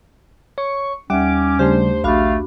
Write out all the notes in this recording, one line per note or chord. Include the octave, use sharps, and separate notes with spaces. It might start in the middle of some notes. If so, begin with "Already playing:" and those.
C#5 C#6
D#2 G3 C#4 E5 F#5 D6
C#3 G3 A3 D4 G4 C5
A#1 A3 D4 F#4 F5 B5